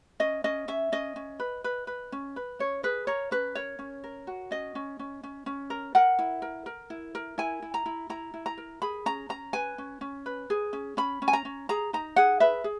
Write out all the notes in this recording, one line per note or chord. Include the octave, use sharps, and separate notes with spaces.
C#4 D#5
C#4 D#5
C#4 E5
C#4 D#5
C#4
B4
B4
B4
C#4
B4
C#4 C#5
G#4 B4
A#4 C#5
C#4 B4
A#4 C#5
C#4
A#4
F#4
C#4 D#5
C#4
C#4
C#4
C#4
A#4
A#4 F#5
E4
A#4
A#4
E4
A#4
E4 G#5
E4
A#5
E4
E4 A#5
E4
A#5
A#4
G#4 B5
C#4 A#5
C#4 A#5
B4 G#5
C#4
C#4
B4
G#4
C#4
C#4 B5
C#4
G#5
A#5
C#4
G#4 A#5
D#4 A#5
G#4 F#5
B4 E5
G#4